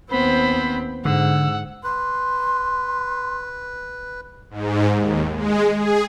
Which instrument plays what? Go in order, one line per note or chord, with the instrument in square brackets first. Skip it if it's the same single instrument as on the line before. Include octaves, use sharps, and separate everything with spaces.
[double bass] D#2 C4 [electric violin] B3 C5 [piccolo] B5
[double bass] G#2 [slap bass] D3 [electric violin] F#5 [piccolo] E6
[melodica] B4 [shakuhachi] C6
[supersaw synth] G#2
D#2
G#3
G#4